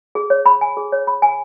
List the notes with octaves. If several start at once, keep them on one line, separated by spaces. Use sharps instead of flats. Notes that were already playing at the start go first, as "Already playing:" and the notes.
G#4
C#5
B5
G#5
G#4
C#5
B5
G#5